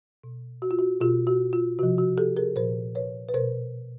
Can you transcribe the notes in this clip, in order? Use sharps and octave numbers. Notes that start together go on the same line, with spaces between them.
B2
F#4
F4
F#4
B2 F4 G4
F#4
F4
C3 F3 F#4
F#4
G4 A4
G#4 A#4
A#2 F3 A#4 C5
B4 C#5
B4
B2 A#4 C5